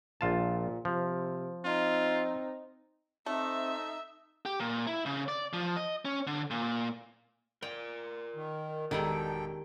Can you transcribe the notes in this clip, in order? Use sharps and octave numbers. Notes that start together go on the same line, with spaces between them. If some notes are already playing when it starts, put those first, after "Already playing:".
A#1 A#2 F4 A5
C3 F3
C4 D#4 F4
A3 C4 D#4 E5
G4
A#2
E4
C#3
D5
F3
D#5
C#4
D3
A#2
A#4 D5 G5
D#3
E1 D#3 G3 G#3 A4 G5 A#5